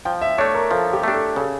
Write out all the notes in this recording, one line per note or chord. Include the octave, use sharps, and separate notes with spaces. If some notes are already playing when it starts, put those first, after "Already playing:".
F3 G5
E5
A3 D4 C#5
A#4
F3 A4
G4
A3 D4 G4
A4
C#3 A4